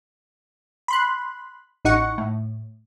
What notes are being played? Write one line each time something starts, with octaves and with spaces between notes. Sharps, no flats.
B5 C6 F#6
A1 D#4 F#5 C#6
A2